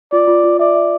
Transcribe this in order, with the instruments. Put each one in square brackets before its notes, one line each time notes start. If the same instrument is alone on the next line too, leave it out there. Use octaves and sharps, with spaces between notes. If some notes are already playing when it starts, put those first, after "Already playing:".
[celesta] F4 [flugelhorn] D5
[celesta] F4
F4
[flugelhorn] D5 [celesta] E5
[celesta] E5